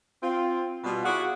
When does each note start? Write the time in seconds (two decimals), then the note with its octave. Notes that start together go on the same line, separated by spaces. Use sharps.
0.23 C4 F4
0.83 B2 G3 F4
1.05 E4 F#4 G#4 D5 F5 F#5